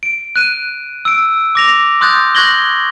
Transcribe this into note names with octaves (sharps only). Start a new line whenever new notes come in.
D7
F#6 D#7
E6 D7
D6 A#6 F7
C6 D#6 F#6 G6 A6
C#6 F#6 G#6 A#6 F#7 G7